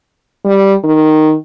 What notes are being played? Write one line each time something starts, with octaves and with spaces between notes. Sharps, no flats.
G3
D#3